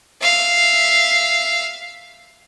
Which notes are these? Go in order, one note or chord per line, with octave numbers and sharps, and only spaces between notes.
E5 F5